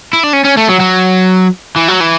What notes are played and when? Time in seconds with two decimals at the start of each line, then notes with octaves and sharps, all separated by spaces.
0.13 E4
0.24 D4
0.33 C#4
0.45 C#4
0.57 A3
0.69 F#3
0.81 F#3
1.76 E3
1.88 F#3
2.00 E3